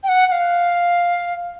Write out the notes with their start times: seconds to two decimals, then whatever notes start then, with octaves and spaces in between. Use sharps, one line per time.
0.03 G5
0.08 F#5
0.27 F#5
0.32 F5